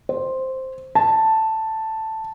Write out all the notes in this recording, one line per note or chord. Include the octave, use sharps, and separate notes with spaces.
C5
A5